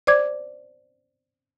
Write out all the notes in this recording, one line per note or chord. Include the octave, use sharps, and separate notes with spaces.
C5 D5 D6 G#6